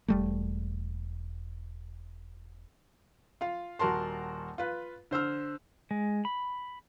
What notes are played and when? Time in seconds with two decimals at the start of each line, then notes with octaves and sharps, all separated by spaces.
0.08 E1 G3 A3
3.41 F4 F5
3.79 D#1 F#4 A#4 A5 C6
4.58 F4 B4
5.11 D3 C5 E6 F6
5.91 G#3
6.25 B5